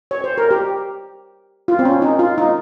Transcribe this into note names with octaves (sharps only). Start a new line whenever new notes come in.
C#5
C5
A#4
G4
F4
C4
C#4
D#4
F4
D#4